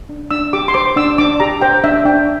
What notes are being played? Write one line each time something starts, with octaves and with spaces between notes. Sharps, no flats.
D4
D4 E6
G4 D6
C6
C5 D6
D4 E6
D4 D6
G4 A#5
C5 G5
D4 E5
D4 G5